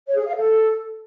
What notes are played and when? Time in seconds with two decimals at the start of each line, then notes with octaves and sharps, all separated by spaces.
0.06 C#5
0.16 G#4
0.25 F5
0.34 A4